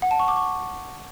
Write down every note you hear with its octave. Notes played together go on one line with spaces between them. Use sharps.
F#5
A5
C#6
D6
C#6